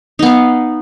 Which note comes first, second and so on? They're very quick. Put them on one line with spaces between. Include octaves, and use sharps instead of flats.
D#4 B3 F5